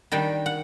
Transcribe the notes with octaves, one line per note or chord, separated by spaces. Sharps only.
D#3 G3 D4 G5
F#5